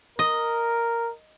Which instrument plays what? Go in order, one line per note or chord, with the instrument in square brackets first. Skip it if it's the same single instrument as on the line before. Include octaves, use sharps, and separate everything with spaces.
[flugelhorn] A#4 [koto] D#5